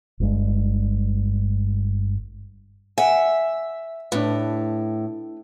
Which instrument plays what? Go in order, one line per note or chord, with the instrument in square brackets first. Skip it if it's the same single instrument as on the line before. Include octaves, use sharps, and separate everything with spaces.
[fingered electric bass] G1 G2 G#3
[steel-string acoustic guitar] E5 [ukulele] F#5 G#5
[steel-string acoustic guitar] A2 [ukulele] D4 B4